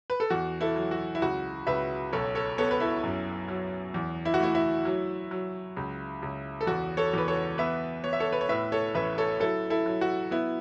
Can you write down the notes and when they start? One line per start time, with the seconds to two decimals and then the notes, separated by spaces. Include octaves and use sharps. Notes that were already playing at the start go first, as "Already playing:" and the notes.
0.10 B4
0.20 A4
0.30 E2 F#4
0.61 E4 A4
0.76 F#3
0.91 F#4
1.15 E4
1.22 C#2 F#4
1.67 C#2 B4 E5
2.13 B1 A4 C#5
2.35 A4 C#5
2.58 B3 A4 C#5
2.71 B4
2.80 E4 A4
3.03 F#2
3.48 F#3
3.94 E2
4.25 E4
4.34 F#4
4.40 A3 E4
4.55 E4
4.85 F#3
5.31 F#3
5.77 C#2
6.22 C#2
6.61 A4
6.67 E2 F#4
6.97 A4 C#5
7.13 E2 B4
7.28 A4 C#5
7.58 B3 B4 E5
8.04 B3 C#5
8.13 E5
8.20 A4 C#5
8.32 B4
8.41 C#5
8.49 A2 B4 E5
8.72 A4 C#5
8.95 A1 B4 E5
9.18 A4 C#5
9.40 F#3 E4 A4
9.70 E4 A4
9.86 F#3
10.01 F#4
10.31 B3 E4